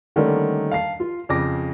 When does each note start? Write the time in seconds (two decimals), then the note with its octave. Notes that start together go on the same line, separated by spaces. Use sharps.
0.16 D3 D#3 G3 A3 A#3 C#4
0.72 F5 A5 C7
1.00 F4
1.29 F2 C#3 D6 A#6